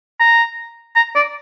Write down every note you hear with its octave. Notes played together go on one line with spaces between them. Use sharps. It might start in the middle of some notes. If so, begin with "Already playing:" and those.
A#5
A#5
D5